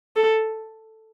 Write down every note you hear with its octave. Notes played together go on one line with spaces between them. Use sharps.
A4